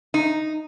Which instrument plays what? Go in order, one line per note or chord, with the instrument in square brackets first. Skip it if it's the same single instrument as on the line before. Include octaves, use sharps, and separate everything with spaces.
[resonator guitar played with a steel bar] D#4